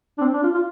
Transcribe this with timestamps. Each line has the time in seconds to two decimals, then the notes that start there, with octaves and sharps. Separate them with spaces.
0.18 D4
0.21 C4
0.34 D4
0.43 F4
0.54 F4